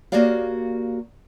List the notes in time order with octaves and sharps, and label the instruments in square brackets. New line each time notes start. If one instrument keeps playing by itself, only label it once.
[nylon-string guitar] A#3 F#4 G4 C#5 D5 F5